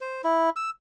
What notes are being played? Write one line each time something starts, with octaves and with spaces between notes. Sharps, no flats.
C5
E4
E6